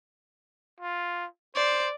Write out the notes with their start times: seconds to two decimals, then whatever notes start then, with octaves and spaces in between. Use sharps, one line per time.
0.80 F4
1.56 C5 D5